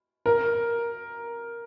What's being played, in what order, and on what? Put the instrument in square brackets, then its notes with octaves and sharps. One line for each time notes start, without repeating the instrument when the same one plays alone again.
[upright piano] A#4